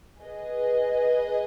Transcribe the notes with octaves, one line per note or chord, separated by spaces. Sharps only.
G#4 B4 D#5